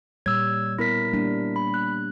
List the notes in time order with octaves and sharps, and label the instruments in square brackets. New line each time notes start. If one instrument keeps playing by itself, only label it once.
[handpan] A#2 G3 C#5 [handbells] E6 G#6
[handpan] B3 [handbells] E4 A#4 B6
[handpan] G3 A#3 D4
[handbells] B5
F#6